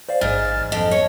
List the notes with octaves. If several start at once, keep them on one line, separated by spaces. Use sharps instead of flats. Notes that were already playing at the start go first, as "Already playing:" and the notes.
C5 D5 F5
A1 G#2 F6 A6
F2 D#5
C#5